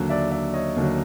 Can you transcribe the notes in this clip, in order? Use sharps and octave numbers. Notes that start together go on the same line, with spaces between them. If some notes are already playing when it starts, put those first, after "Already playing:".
Already playing: D#2 D3 F#3
D5 E5
D5 E5
C#5 D#5
D#2 D3 F#3